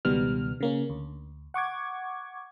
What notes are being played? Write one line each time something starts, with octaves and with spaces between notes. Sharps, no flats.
C#2 B2 D#3 G3 B3 F6
C#3 A#3 C#4
D2
F#5 C#6 D6 G#6